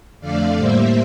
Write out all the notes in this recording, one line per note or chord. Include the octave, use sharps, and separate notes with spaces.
F2 D3 A3 D5 F5
A2 G3 A#3 C5 E5